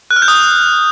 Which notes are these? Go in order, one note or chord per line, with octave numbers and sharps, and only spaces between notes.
F#6
F6
G6
D#6